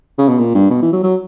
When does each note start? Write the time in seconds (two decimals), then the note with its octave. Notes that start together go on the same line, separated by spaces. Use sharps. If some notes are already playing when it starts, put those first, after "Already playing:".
0.18 C#3
0.29 B2
0.39 A#2
0.55 G2
0.71 B2
0.82 E3
0.93 F#3
1.04 F#3